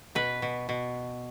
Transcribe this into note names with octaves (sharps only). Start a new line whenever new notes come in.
B2 B4
B2
B2